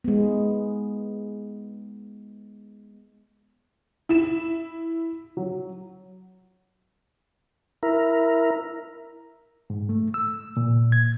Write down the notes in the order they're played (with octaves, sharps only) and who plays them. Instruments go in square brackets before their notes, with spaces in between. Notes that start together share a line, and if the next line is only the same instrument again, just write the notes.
[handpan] G#3 B3
[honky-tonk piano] E4 E7
F#3
[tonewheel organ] E4 A#4
[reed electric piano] G#2
A3
E6
A#2
G#6